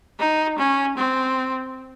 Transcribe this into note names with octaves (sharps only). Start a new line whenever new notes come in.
D#4
C#4
C4